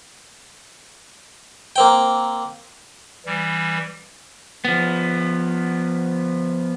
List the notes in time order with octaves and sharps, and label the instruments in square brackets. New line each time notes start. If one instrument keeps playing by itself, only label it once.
[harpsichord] A#3 C4 G5
[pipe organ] E3 G3
[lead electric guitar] F3 B3